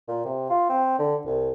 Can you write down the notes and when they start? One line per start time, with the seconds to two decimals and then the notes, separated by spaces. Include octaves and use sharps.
0.08 A#2
0.25 C3
0.50 F4
0.70 C4
0.99 D3
1.25 C2